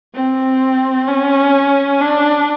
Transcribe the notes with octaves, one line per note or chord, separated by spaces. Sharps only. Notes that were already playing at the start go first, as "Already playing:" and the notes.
C4
C#4
D4